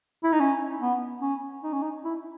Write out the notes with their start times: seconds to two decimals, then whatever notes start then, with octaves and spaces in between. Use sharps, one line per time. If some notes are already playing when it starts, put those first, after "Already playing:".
0.23 E4
0.32 D#4
0.40 C#4
0.81 B3
1.22 C#4
1.63 D#4
1.73 C#4
1.82 D#4
2.04 E4